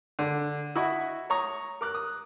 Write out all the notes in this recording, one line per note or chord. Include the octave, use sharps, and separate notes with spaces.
D3
E4 F#4 D#5 B5 C#6
C#5 A#5 C#6 D#6
A#4 D6 F#6
D#6